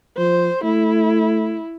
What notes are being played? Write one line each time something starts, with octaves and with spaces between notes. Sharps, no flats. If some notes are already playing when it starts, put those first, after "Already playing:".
F3 C5
A3 E4